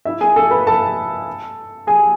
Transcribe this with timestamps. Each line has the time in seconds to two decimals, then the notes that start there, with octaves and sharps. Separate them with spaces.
0.05 E4 E5
0.21 G#4 G#5
0.36 A4 A5
0.51 B4 B5
0.67 A4 A5
1.87 G#4 G#5